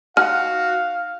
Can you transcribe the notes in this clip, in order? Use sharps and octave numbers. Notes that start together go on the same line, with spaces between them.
D#4 F#4 F5 F#5 G#5 F6